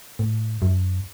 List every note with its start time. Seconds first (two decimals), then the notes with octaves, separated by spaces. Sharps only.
0.19 A2
0.62 F#2